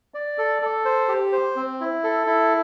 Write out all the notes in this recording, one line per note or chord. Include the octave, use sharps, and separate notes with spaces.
D5
A4
A4
C5
G4
C5
C4
E4
A4
E4